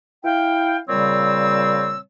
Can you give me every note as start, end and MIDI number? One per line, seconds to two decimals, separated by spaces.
0.25 0.78 64
0.25 0.78 77
0.25 0.78 79
0.88 1.98 46
0.88 1.98 49
0.88 1.98 55
0.88 1.98 60
0.88 1.98 73
0.88 1.98 88